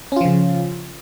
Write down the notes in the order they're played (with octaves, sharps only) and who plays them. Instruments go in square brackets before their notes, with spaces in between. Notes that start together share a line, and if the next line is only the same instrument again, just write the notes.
[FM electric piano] C#4
F4
F3
C#3